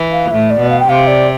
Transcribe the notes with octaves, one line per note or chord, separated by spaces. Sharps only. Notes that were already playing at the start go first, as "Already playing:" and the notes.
Already playing: E3
F5
A2 E5
D5
B2
F5
G5
C3 F5
D5